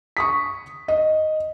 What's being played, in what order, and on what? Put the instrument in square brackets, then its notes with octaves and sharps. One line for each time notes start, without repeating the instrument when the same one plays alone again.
[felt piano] C#6 D#6 B6
D#5